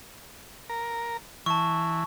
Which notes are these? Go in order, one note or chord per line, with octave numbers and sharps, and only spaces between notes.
A#4
E3 A5 C#6